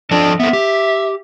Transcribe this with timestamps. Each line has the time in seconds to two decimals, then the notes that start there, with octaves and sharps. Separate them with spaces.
0.11 F3 D4 A4 D#5
0.40 B3 C4 A4 E5
0.53 G4